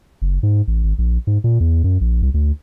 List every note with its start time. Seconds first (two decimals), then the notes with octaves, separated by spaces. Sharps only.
0.22 F#1
0.43 G#2
0.67 A1
0.84 G#1
0.98 A#1
1.27 G#2
1.44 A#2
1.60 E2
1.84 F#2
2.01 A#1
2.22 C2
2.34 D2